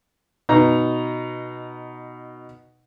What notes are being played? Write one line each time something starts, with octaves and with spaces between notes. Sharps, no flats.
B2 D#4 A#5